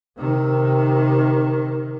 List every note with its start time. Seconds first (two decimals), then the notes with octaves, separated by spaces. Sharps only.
0.18 C3 D#3